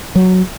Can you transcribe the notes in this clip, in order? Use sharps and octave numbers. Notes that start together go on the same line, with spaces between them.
F#3